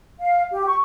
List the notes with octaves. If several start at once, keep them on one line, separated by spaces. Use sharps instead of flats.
F5
G4
C#6